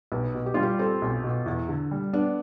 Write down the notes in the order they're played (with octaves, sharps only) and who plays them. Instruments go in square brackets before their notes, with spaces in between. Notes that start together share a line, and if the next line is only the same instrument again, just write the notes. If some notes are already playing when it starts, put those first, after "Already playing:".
[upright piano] B1 [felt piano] B4
[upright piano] B2
[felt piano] G4
[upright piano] G3 [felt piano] F4
[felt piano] G4
[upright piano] C4 [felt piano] A4
[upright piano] B1
B2
E2
D3
G3
[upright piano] B3 [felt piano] D4